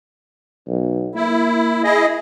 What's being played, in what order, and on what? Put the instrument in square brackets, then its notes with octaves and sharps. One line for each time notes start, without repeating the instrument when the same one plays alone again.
[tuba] B1
[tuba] A#3 [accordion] E4
[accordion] E4 G#4 D#5